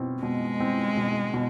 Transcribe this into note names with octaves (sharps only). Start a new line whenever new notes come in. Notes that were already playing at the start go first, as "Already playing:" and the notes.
Already playing: B2 C4
B2 G#3
C4
B2
B2